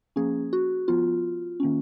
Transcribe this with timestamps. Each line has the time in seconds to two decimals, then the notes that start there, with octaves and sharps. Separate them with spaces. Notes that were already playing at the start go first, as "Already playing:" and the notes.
0.16 F3 A#3 C#4 G#4
0.53 F#4
0.88 F3 B3 F4
1.60 D#3 A#3 C#4